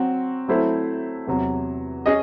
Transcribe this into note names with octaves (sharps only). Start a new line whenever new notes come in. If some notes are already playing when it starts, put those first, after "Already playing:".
Already playing: F#3 C4 F#4
F#3 A3 C4 E4 C5
E2 C3 F#3
C#4 G#4 D#5